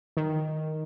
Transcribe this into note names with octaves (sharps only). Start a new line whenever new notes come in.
D#3